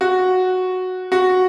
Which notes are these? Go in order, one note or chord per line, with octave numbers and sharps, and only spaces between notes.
F#4
F#4